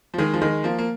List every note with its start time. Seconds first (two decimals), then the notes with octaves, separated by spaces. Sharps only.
0.14 F3
0.18 D#3 G#3
0.33 F3
0.41 D#3 G#3
0.64 F3 A#3
0.78 A#3